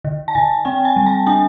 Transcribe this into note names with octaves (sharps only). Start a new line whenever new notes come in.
D3
A5
D3 G#5
C4 G5
G#5
G3
A5
D4 G#5